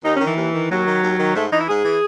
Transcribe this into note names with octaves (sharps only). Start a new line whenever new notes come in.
D#2 D#4
C#4
D#3
E3
D#2
D#3
D#2 F#3
D#3
D#2
D#3
G#2 A3
E3 D#4
E4
G#2 G#4
E3